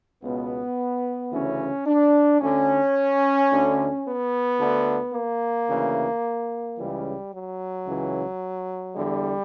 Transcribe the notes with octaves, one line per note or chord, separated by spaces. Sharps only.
C#2 B2 B3
D2 C#3 E3 C#4
D4
D2 D3 C#4
D2 D3
B3
D2 D3
A#3
D2 C#3 E3
C#2 C#3 E3 G3
F#3
C#2 C#3 E3
E2 D3 G3